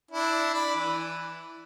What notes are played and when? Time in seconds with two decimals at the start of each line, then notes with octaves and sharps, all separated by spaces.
0.11 D4 E4
0.54 D5 B5
0.76 E3